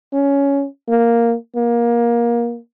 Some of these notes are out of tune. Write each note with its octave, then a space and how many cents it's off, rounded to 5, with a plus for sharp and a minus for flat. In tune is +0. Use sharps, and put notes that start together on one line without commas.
C#4 +10
A#3 +0
A#3 +20